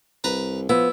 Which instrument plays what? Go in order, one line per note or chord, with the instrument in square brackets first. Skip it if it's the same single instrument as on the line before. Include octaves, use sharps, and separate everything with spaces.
[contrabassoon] C2 [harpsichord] B4 A#5
[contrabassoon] F3 [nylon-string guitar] B3 [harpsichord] E4